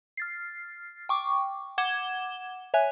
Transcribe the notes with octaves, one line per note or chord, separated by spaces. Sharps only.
F6 A6 C7
G5 C#6 D6
F#5 D6 G#6 E7 G7
C#5 E5 G#5 F#6